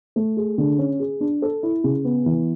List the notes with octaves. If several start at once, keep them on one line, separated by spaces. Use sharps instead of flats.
A3
G#4
D3
C#4
G#4
D4
A4
E4
C#3
B3
E3